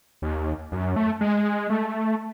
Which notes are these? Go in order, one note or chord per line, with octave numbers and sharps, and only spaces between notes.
D#2
F#2
A3
G#3
A3